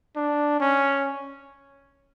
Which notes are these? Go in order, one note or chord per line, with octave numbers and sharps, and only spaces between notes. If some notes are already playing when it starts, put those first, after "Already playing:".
D4
C#4